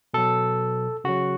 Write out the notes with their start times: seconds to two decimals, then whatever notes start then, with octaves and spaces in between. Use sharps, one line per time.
0.14 B2 F#3 A4
1.04 C#3 F#3 F#4